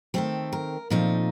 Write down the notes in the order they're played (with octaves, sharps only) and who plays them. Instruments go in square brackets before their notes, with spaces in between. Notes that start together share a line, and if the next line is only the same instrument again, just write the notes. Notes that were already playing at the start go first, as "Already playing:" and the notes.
[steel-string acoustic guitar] D#3 A3 C4 A4
A#4
A#2 F3 A3 C4 D#4